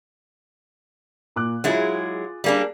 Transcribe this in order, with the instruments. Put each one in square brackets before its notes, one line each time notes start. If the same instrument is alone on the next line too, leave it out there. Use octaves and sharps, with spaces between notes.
[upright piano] A#2 D6 F#6
[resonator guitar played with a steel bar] F#3 G#3 E4 [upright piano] F4 G#4 A6
[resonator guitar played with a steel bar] G3 A#3 D4 [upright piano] G#4 D5